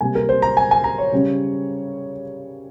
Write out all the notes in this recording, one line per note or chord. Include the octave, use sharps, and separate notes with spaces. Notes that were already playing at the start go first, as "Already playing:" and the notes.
C3 G3 A#3 G#5
A#4
C5
A#5
G#5
G#5
A#5
C#5
C#3 G3 C#4